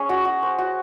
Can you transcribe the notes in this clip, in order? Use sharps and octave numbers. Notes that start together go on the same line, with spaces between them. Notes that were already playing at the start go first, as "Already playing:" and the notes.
Already playing: C#4 G#4 C#5
F#4
F#4
C5
F#4